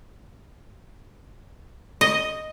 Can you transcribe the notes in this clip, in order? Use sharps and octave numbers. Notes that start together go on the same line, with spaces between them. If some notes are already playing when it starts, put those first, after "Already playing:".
D#5